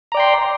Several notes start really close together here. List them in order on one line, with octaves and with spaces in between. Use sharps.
A#5 D5 G5 C6